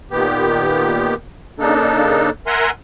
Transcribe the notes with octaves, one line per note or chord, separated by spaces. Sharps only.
A#2 D#3 B3 G4
C#3 A#3 D4 D#4 A4
A#4 E5 F#5 G#5 A#5 C6